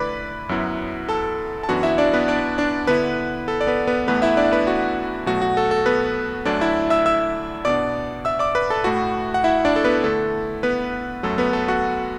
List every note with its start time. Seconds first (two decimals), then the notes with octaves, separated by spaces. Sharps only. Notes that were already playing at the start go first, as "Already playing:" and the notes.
Already playing: D3 A3 E4 B4 D5 B5 D6
0.49 F#2 F#3 B3 E4
1.09 A4 A5
1.63 A5
1.68 F#2 E3 B3 D4 F#4 F#5
1.83 E4 E5
1.98 D4 D5
2.14 B3 B4
2.28 D4 D5
2.58 D4 D5
2.87 D3 B3 E4 B4
3.48 A4
3.61 D5
3.67 B3 B4
3.87 B3 B4
4.08 E2 E3 A3 B3 B4
4.22 E4 E5
4.37 D4 D5
4.52 B3 B4
4.67 F#4
5.26 B2 F#3 A3 F#4
5.42 F#4
5.57 A4
5.71 A4
5.86 B3 B4
6.45 D2 D3 F#3 A3 D4 D5
6.61 E4 E5
6.90 E5 E6
7.06 E5 E6
7.65 B2 B3 D4 D5 D6
8.25 E5 E6
8.39 D5 D6
8.55 B4 B5
8.70 A4 A5
8.84 A2 A3 E4 F#4 F#5
9.34 F#5
9.44 E4 E5
9.65 D4 D5
9.76 A4
9.85 B3 B4
10.03 D3 A3 E4 A4
10.63 B3 B4
11.23 F#2 F#3 A3 A4
11.38 B3 B4
11.53 A4
11.68 F#4 F#5